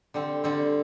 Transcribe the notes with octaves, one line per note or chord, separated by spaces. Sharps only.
D3 G3 C4
D3 G3 C4